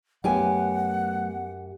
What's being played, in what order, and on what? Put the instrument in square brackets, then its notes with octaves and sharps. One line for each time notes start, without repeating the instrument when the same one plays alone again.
[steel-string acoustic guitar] F#2 G4 G#5 [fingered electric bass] F#3 A3 B3 [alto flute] F#5